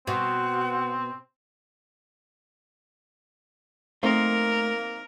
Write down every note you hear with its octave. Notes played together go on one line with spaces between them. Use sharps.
B2 C4 F#5
A3 A#3 C4 D#4 A#4